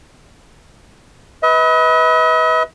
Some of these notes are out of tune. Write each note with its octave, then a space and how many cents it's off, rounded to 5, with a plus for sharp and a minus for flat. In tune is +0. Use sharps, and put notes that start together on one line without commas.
B4 +0 D#5 +45